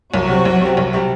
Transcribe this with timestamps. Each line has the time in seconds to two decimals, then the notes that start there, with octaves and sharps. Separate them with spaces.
0.14 C2 F#3 F#4
0.29 C3 G3 C4
0.45 C2
0.62 C3 G3 C4
0.77 C2
0.93 C3 G3 C4